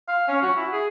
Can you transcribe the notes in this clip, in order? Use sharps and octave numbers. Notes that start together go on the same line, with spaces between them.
F5
C#4
F#4
E4
G#4